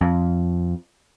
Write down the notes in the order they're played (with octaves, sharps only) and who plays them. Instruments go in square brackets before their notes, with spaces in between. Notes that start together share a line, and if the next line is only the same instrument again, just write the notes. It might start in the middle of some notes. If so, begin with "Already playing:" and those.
[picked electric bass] F2